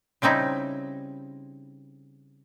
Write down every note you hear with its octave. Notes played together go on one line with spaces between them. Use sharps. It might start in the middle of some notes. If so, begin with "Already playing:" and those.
C#3 G3 C4 D#4 E4